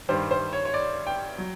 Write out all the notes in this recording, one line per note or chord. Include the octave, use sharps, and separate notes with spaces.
G2 D#3 G3 C5
C5
C#5
C#5
D5
G5
F#3